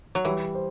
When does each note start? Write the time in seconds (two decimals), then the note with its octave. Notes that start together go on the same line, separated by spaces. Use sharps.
0.15 F#3
0.25 E3 G3
0.55 C5